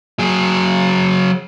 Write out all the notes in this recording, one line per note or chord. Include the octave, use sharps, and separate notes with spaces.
F#3 G#4